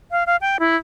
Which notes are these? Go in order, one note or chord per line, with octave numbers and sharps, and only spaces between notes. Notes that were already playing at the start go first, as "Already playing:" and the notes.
F5
F5
G5
E4